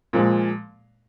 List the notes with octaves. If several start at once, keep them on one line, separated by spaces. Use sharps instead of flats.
A#2 F3 G#3